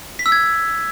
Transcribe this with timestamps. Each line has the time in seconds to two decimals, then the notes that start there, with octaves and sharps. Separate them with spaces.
0.19 B6
0.26 E6
0.32 G#6